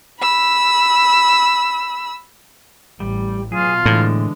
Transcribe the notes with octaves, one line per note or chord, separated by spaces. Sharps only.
B5 E6
A1 G3
B2 F#3 F4 G#4
A2 D3 E3 G#3